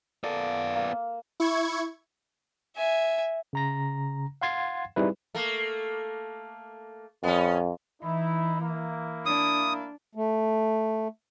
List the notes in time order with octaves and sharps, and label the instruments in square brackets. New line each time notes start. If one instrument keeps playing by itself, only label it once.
[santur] A#3 A4 [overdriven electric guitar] B3 D5
[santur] A#3
[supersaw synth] E4 C#6 G#6
[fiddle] E5 G#5
[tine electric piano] C#3 A#5 A#6
F5 F#5 C6 G#6 A6 C7
G3 C4 D#4 E4 G#4 B4
[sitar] A3 A#3
[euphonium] F2 [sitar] B3 C#4
[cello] E3 [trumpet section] D#4 E4
[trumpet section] A#3 E4
[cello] D4 [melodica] D#6
[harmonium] A3